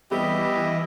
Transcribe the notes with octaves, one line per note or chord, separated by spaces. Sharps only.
E3 G3 B3 G4 D#5 E5